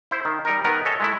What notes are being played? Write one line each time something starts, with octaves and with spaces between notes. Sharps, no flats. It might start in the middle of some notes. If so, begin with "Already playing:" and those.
E4 C5
D#3
G3 D#4 A#4
D#3 B3 A#4 B4
A4 C#5 D#5 E5 G#5
G#3 A3 E4